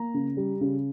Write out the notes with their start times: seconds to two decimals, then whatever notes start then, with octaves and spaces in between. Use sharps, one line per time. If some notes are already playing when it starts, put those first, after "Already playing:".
Already playing: A#3 A#5
0.14 C#3
0.37 G3
0.61 C#3